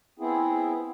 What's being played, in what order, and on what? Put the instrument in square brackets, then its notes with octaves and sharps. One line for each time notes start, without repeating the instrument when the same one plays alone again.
[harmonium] B3 C4 E4 G#4